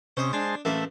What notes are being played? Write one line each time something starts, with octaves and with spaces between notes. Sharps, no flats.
C3 C#4 C5 D#5
G#3 D4 C5 A5
A1 A3 A#3 E4 E5